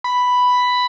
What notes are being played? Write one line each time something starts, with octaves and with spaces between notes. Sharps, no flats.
B5